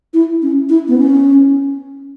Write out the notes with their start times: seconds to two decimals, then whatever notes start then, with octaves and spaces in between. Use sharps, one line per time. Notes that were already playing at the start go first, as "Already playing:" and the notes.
0.14 E4
0.42 C#4
0.69 E4
0.88 B3
0.98 C#4